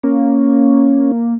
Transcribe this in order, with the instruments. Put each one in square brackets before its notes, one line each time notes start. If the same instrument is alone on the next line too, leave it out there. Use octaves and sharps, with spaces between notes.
[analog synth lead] A#3 [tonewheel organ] C#4